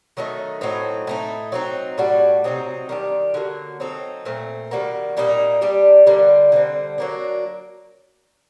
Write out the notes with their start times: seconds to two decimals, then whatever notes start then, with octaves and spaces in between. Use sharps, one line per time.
0.17 D#3 F#3 A3 D#4
0.61 A2 F#3 C4 D#4
1.07 A2 A3 D#4
1.52 F#3 C4 D#4
1.98 A2 G3 D4 F#4
2.44 C3 F#3 C4 D#4
2.89 D#3 G3 D4 G4
3.34 D3 F#3 A#3
3.80 F#3 C4 D#4 A4
4.25 A#2 A3 C4
4.71 D#3 G3 A#3 F#4
5.17 A#2 G3 A#3 D#4
5.61 G3 D4 G4
6.07 D3 G3 A#3 D4
6.52 D3 G3 C4
6.98 F#3 A#3 D4